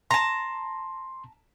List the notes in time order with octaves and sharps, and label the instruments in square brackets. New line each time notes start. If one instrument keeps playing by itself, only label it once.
[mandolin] A5 A#5 [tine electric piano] C6